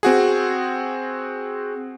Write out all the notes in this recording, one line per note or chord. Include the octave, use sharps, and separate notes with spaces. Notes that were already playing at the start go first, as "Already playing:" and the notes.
C4 F#4 G#4